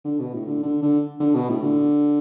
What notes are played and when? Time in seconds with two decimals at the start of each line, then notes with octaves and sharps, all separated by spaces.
0.05 D3
0.20 B2
0.34 A2
0.48 D3
0.63 D3
0.82 D3
1.20 D3
1.35 B2
1.49 A2
1.63 D3